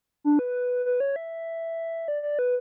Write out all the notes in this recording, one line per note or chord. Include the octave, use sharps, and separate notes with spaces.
D4
B4
B4
C#5
E5
D5
D5
B4